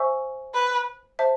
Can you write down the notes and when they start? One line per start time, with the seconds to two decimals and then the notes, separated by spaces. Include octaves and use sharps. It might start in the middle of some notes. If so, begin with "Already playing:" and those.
Already playing: C5 E5 G#5 C#6 E6
0.54 B4
1.19 C5 E5 A5